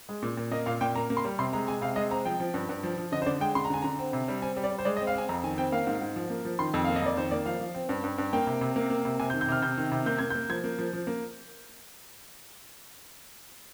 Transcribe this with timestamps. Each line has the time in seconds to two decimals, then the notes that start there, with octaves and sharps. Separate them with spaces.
0.09 G#3
0.23 A#2
0.37 A#2
0.51 A#3 D#5
0.66 A#2 F5
0.81 A#2 G5
0.95 A#3 A#5
1.10 A#3
1.17 C6
1.25 G3
1.39 C3 C6
1.53 G#3 A#5
1.68 G#3 G#5
1.81 C3 F5
1.96 G#3 D#5
2.11 C4 A#5
2.25 F3 G5
2.40 F3
2.54 G2
2.69 G2
2.83 F3
2.98 F3
3.12 D3 D#5
3.22 C5
3.26 D3 D5
3.40 G#3 G5
3.55 D3 C6
3.65 A#5
3.70 D3 G#5
3.82 D3 A#5
3.99 C4
4.13 C3
4.28 G3
4.42 C4 G#5
4.56 G3
4.64 D5
4.71 G3
4.78 C5
4.85 G#3 D5
4.97 D#5
5.00 C4
5.07 F5
5.14 C4 G#5
5.29 F2 A#5
5.44 D#3 G#5
5.58 C4 G5
5.72 A#3 F5
5.87 G#2
6.01 G#2
6.16 F3
6.30 A#3
6.45 F3
6.59 D#3 C6
6.74 F2
6.84 A#3 F5
6.96 D#5
7.02 F2 D5
7.17 D#3 C5
7.31 A#3 D5
7.46 F3 F5
7.60 F3
7.75 C4
7.89 G2
8.04 G2
8.18 G2
8.33 A#3 G5
8.47 C3
8.61 C3
8.76 A#3
8.90 A#3
9.05 C3
9.19 C3 G#5
9.30 G6
9.34 D#3
9.41 G6
9.48 C3 F6
9.62 C3 G6
9.78 D#3
9.91 C3
10.06 A#3 G6
10.19 A#3 G#6
10.30 G6
10.35 A#3
10.49 F3 G#6
10.64 A#3
10.78 F3
10.93 F3
11.07 A#3